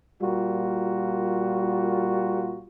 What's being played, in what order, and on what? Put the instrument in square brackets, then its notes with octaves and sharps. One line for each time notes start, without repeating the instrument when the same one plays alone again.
[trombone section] A#2 G3 F4 F#4 A#4